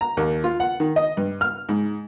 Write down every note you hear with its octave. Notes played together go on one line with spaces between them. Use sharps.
A#5
D#2
F4
F#5
D#3
D#5
G2
F6
G#2